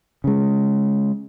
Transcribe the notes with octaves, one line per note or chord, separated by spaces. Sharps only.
C#3 G#3